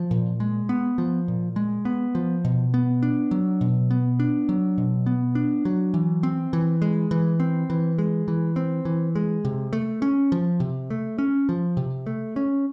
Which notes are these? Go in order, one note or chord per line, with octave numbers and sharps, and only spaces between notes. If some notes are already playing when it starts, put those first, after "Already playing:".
Already playing: F3
A#2
G#3
B3
F3
A#2
G#3
B3
F3
B2
B3
D4
F#3
B2
B3
D4
F#3
B2
B3
D4
F#3
E3
C4
E3
G#3
E3
C4
E3
G#3
E3
C4
E3
G#3
C3
A3
C#4
F3
C3
A3
C#4
F3
C3
A3
C#4